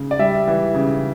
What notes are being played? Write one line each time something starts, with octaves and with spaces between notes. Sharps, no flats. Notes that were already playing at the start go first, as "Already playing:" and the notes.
Already playing: C#3
D5
G3 E5
E3
C#3